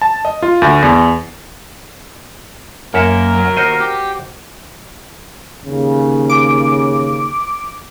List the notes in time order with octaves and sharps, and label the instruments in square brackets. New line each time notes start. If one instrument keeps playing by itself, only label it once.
[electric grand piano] A5
D#5
F4
D2
E2
[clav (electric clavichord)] F#2 C#5 E5 [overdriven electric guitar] A#3 [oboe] A#4
[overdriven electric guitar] F#3
[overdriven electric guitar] D#2 [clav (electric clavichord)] F#4 C5 D#5
[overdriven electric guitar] G4
[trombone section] D#2 C#3
[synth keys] D6